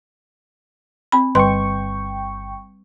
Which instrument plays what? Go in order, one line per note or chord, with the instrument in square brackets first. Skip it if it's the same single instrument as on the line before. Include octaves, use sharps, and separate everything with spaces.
[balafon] C4 B5
[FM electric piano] G1 G5 C#6 [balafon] G3 B4 C6